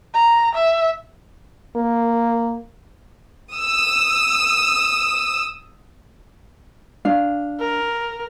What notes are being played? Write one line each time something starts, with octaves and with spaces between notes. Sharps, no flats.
A#5
E5
A#3
D#6 E6
D4 F5
A#4